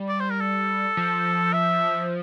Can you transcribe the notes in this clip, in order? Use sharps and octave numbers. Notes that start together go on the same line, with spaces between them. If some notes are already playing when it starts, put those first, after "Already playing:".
Already playing: G3
D5
C5
A#4
A4
F3
E5